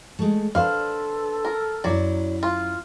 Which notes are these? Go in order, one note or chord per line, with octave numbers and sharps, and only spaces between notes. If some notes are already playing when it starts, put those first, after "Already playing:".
G#3 A3
D4 A4 B4 C5 F5
A#4
F#2 F#3 E4 D5
F4